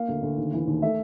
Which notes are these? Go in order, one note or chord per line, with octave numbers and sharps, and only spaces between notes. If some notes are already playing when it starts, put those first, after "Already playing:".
Already playing: A#3 F5
D2
D2
D#2
E3
D#2
A3 E5